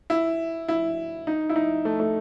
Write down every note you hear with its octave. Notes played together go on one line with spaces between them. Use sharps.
E4
E4
D#4
E4
D#4
A3
A3